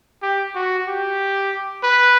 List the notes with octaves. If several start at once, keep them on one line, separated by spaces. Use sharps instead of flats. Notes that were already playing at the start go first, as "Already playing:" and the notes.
G4
F#4
G4
B4